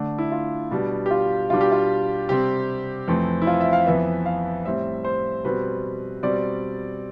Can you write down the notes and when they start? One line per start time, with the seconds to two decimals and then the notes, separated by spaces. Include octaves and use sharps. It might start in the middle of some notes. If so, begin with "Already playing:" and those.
Already playing: D3 A3 D4
0.18 E4
0.32 F4
0.71 B2 G3 D4
1.06 G4
1.11 F4
1.50 B2 G3 D4 F4
1.61 G4
1.72 F4
2.29 C3 G3 C4 G4
3.08 F2 E3 A3 C4
3.42 E4
3.47 F4
3.61 E5
3.73 F5
3.86 F2 E3 B3 E5
4.26 F5
4.65 A2 G3 C4 E5
5.05 C5
5.45 B2 G3 C4 B4
6.23 B2 G3 C4 D5